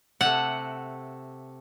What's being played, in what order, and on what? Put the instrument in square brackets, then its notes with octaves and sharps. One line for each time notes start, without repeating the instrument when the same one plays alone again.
[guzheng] C3 A3 [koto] F#5